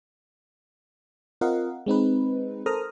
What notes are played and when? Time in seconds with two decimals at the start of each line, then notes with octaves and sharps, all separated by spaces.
1.41 C4 F4 A#4 D#5 F5 F#5
1.86 G#3 C4 D#4 B4
2.66 A4 A#4 C5 A#5 D#6 F6